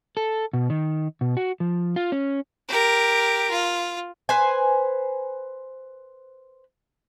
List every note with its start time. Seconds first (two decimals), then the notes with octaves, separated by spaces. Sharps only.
0.17 A4
0.53 B2
0.70 D#3
1.21 B2
1.37 F#4
1.60 F3
1.96 F4
2.12 C#4
2.69 G4 A#4
3.51 F4
4.29 B4 C5 G#5